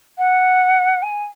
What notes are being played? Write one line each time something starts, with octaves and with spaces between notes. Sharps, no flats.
F#5
G#5